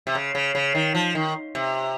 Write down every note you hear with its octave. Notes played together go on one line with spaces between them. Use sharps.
C3
C#3
C#3
C#3
D#3
F3
D#3
C3